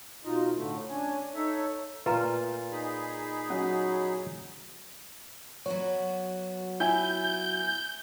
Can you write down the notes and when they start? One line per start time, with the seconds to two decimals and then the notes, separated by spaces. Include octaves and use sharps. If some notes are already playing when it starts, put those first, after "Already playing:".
0.25 B2 D#4 F4 D#5
0.55 A2 D3 A3
0.90 C#4 D4 G#5
1.35 D#4 A4 C#5 E5
2.06 A#2 A3 F4 B4 A#5
2.72 D#4 G#4 B5
3.50 F#3 C#4
5.66 F#3 B3 F#4 C#5
6.80 E4 G#5 G6